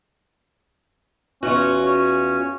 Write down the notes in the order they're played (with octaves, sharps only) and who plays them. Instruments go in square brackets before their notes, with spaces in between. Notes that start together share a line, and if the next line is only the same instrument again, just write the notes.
[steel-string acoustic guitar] E2 F4 F#4 [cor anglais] C#4
[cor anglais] C#4